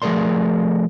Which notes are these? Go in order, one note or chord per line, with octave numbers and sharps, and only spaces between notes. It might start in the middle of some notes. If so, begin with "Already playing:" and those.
F3 A3 G#4 A#4 D5 C6